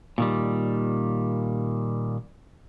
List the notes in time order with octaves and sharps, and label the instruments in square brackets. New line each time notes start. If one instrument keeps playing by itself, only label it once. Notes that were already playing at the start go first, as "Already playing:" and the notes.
[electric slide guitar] A#2 D#3 G3